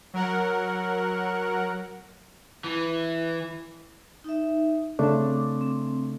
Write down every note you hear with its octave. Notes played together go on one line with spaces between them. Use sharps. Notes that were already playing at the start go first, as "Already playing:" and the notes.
F#3 A#4 F#5
E3
D#4 E5
C#3 A3 C4 D4 D6
C4